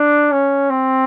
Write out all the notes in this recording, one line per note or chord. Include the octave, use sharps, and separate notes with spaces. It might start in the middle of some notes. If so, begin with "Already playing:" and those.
Already playing: D4
C#4
C4